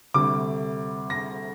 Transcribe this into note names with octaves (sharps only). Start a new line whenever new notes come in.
D2 C3 G3 D6
A#6